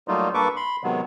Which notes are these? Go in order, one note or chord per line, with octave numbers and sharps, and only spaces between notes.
F#3 G3 A3 A#3 D#4 F4
G2 A#3 A4 B4 C#6 D6
B5 C6
C3 D#3 F#3 G#3 B3